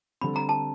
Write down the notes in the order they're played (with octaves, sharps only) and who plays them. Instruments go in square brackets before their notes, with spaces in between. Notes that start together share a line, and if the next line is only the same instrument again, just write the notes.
[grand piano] D3 G3 C4 [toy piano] B5
[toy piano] A#5
A5